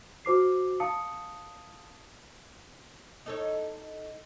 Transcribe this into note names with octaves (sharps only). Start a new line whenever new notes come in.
F#4 C5 D6 C7
F5 A5 D#6 C#7
D#4 A4 C#5